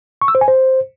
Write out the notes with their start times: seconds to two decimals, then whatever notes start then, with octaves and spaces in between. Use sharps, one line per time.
0.22 C#6
0.28 E6
0.35 C5
0.41 G#5
0.48 C5